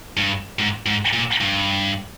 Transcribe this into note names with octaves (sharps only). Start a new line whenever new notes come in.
G2
G#2
G#2
A#2
G2